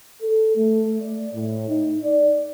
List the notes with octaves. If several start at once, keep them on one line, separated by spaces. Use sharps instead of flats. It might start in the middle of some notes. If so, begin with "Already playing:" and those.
A4
A3
D5
A2
D#4
D5